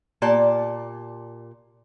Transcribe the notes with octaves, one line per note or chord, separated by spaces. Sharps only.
A#2 G4 D5 A5